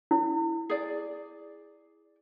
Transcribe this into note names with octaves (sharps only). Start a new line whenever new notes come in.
E4
G#4 D5